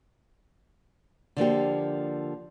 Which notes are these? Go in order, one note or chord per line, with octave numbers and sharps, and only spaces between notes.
D3 F3 A#3 G4